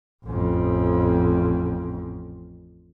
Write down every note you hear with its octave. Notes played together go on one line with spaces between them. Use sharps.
A1 F2